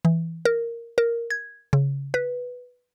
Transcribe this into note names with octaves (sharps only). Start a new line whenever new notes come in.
E3
A#4
A#4
G#6
C#3
B4